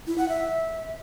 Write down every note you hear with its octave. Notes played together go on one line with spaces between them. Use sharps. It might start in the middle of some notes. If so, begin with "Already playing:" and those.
E4
F#5
E5